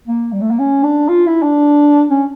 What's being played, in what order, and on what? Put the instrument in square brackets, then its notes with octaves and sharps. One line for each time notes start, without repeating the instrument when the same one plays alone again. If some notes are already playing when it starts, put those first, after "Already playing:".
[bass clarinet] A#3
G3
A3
A#3
C#4
D4
F4
E4
D4
C#4